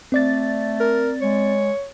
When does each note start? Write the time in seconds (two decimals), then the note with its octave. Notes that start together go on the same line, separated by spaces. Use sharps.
0.12 A3 C4 D5 A6
0.80 A#4
1.21 G#3 C#5